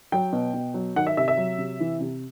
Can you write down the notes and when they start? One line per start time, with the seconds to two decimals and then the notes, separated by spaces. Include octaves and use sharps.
0.12 F#3 G5
0.33 B2
0.54 B2
0.74 F#3
0.96 D#3 F#5
1.07 E5
1.17 C3 E5
1.28 E5
1.37 F#3
1.58 C3
1.80 E3
2.00 C3